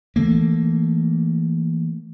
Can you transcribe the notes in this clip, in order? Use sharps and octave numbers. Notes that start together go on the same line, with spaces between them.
E3 A3 A#3